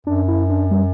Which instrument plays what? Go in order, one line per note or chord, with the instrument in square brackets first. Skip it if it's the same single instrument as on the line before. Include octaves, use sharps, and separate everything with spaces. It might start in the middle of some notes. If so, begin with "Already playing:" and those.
[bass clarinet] F#2 [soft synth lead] D4
[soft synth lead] E4
D4
G3